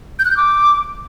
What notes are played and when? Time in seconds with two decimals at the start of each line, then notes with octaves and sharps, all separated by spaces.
0.19 G6
0.25 F#6
0.31 G6
0.37 D6